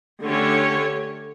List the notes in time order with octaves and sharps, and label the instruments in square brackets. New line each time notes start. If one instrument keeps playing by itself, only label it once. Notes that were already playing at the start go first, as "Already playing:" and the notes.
[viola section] D3 A3 C#4 G4 C#5